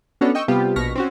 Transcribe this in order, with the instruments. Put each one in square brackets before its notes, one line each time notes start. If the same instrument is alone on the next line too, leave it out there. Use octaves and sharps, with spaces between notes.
[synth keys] B3 C#4 D4 F#4 A4 C#5
D#5 G5 C#6 E6
C3 G3 B3 F4 G4
A#1 B2 C#6 F6 A#6 B6
C4 C#4 F#4